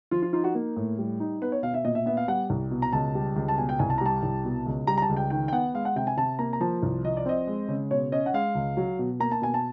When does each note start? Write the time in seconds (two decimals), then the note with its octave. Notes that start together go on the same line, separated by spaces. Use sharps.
0.11 F3 F4
0.22 F4
0.33 D#4 F4
0.44 F#4
0.55 A#3
0.76 A2
0.98 G3
1.20 D#4
1.42 B3 B4
1.52 C#5
1.63 B2 F5
1.74 E5
1.85 A#2 D#5
1.95 E5
2.06 B3 E5
2.17 F5
2.28 G3 F#5
2.50 C2
2.71 B2
2.82 A#5
2.93 C#2 A5
3.15 G3
3.36 C#2
3.48 A5
3.58 B2 G#5
3.69 G5
3.79 C2 G#5
3.90 A5
3.98 A#5
4.01 G3 A5
4.23 C2
4.45 B2
4.66 C#2
4.87 G3 A#5
4.98 A#5
5.02 A5
5.09 C#2
5.17 G5
5.30 D#3 G5
5.48 G5
5.52 B3 F#5
5.74 G#3 F5
5.85 F#5
5.96 C3 G5
6.07 G#5
6.17 C3 A5
6.39 A#3 A#5
6.53 A#5
6.60 F3 A5
6.83 C2
7.04 F3 D#5
7.17 D5
7.26 C4 D#5
7.47 G#3
7.68 C#3
7.91 B2 C#5
8.12 C#4 D#5
8.26 F#5
8.34 G#3 F5
8.55 C#2
8.77 F#3
8.99 B2
9.20 A#3 A#5
9.31 A5
9.42 B2 G#5
9.54 A5